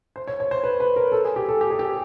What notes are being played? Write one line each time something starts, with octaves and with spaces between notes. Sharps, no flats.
C5
C#5
C#5
C5
B4
B4
A#4
A4
G#4
G4
A4
G4
G#4
G4